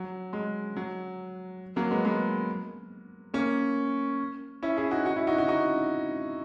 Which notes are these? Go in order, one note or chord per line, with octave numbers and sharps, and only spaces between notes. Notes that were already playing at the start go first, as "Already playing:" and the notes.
Already playing: F#3
G#3
F#3
F#3 A#3
G#3 B3
G#3 B3
A#3 C#4
C#4 E4
E4 G#4
D#4 F#4
D#4 F#4
C#4 E4
D#4 F#4
D#4 F#4
D#4 F#4